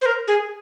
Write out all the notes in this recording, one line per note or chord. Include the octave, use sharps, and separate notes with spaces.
C5
A#4
G#4